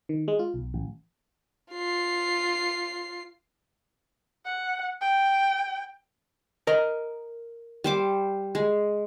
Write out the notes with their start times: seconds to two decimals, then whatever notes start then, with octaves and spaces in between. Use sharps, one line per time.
0.09 D#3
0.28 G#3
0.39 F4
0.54 B1
0.74 A1
1.72 F4 C7
4.45 F#5
5.01 G5
6.67 A#4 D#5 A#5
7.84 G3 C5 D6
8.55 G#3